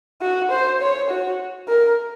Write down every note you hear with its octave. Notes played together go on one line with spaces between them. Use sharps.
F#4
C5
C#5
F#4
A#4